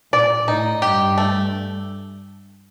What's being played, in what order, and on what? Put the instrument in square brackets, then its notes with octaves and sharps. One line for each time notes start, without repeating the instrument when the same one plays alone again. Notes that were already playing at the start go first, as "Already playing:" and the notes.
[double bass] A#2 [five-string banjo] D5
[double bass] A2 [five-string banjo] D#4
[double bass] G2 [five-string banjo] G4
[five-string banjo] A3